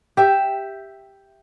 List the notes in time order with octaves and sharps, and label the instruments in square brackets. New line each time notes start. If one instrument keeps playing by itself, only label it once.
[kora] G4 E5